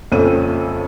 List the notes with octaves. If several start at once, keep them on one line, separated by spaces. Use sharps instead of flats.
A#1 F2 C#3 C4 A4 D#7